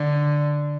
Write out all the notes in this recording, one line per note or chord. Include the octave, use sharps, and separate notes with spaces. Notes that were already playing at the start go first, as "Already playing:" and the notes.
Already playing: D3